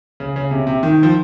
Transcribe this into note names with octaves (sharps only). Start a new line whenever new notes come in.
C#3
C#3
C3
C3
D#3
F3